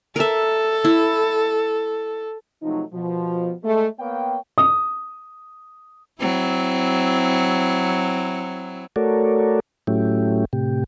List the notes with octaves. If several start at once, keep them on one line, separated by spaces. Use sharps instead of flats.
A4 A#4 E5
E4
C3 F3 F#3 A3 D#4
B2 F3
G#3 A3
A#3 B3 C#5 F5 G5
D#6
F#3 C4 E4
A3 F#4 A4 A#4 C#5 D5
A2 F#3 A3 C#4 E4 G4
A2 C3 G4